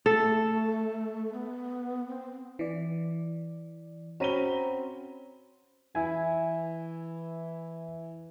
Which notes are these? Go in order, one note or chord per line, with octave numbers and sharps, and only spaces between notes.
A3 A4
B3
C4
E3 D5
C4 C#4 F#4 A#5 B5 D#7 G7
E3 E4 G#5